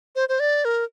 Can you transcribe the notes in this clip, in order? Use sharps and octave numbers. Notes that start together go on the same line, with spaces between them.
C5
C5
D5
A#4